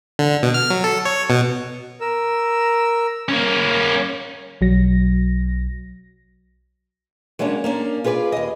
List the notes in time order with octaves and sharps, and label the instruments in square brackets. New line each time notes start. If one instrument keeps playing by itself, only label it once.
[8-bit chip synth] D3
B2
F6
F#3
A4
C#5
B2
[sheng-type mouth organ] A#4 E6
[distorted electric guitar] A#3 C#4
[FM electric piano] B1 F#3 A#6
[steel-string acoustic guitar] F#3 G#3 A#3 C#4 D4
A#3 C#4 D4
F4 G#4 B4 C5 D5
D#2 D#5